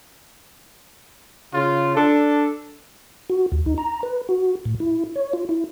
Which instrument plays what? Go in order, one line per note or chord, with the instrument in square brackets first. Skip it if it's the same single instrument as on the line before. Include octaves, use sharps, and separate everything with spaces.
[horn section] C#3 F4
D4 A4
[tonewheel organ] F#4
D#2
D#4
A#5
B4
F#4
A2
E4
C#5
F4
E4